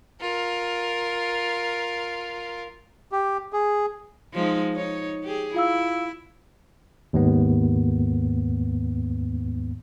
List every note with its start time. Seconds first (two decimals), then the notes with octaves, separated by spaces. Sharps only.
0.21 F4 A#4
3.12 G4
3.53 G#4
4.34 F3 G#3 D#4
4.74 D#4 C#5
5.24 G4 G#4
5.54 E4 F4 F5 E6
7.13 D#2 G#2 B3